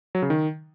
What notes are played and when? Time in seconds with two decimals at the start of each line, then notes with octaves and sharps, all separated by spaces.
0.15 F#3
0.22 C#3
0.30 D#3